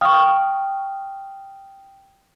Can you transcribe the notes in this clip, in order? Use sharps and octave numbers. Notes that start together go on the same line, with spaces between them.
F5 G5 C#6 D#6 F6